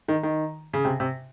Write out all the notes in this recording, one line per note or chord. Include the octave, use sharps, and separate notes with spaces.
D#3
D#3
C#3
C3
C3